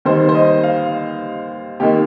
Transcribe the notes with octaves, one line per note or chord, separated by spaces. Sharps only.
D#2 D#3 G3 A#3 C5
C5
D#5
F5
D#2 D#3 A#3 G4